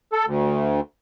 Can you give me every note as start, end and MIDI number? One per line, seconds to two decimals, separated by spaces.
0.13 0.25 69
0.26 0.80 38